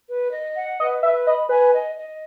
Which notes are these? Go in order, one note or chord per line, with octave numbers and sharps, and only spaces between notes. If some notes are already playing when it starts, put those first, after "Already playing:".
B4
D#5
F#5
B4 D#5
B4 E5
D#5 B5
B4 G#5
D#5
D#5